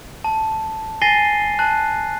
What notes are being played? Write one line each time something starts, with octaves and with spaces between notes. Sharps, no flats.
A5
G#5 A6 A#6 C7 D#7 G7
A5 F#6